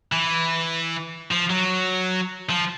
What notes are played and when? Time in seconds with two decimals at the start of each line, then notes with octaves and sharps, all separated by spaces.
0.12 E3
1.31 F3
1.50 F#3
2.50 F3